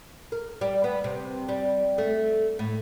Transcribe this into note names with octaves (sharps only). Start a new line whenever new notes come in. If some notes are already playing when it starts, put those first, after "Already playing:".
A#4
G3
B3
C3
G3
A3
A2